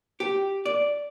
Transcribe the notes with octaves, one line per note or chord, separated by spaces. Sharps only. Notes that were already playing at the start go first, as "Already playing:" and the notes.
G4
D5